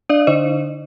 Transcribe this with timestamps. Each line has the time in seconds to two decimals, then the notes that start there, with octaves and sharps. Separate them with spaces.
0.09 D4 D5 F5
0.27 D3 C5 D#5